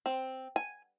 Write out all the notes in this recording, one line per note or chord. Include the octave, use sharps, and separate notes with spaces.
C4
G#5